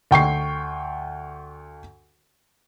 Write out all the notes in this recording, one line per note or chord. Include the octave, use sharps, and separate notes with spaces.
D2 G5 C#6 C7